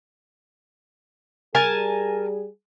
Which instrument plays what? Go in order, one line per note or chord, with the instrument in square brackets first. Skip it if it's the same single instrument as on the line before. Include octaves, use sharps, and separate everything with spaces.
[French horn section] G3 G#4 [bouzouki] A#4 G#5 A5